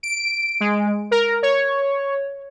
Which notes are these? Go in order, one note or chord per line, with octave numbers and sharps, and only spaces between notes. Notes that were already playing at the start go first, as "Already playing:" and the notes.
D7
G#3
A#4
C#5